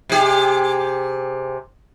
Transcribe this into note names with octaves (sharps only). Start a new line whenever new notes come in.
C3 G4 G#4